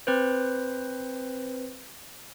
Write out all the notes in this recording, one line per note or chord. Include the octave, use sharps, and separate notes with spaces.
C4 B4 C5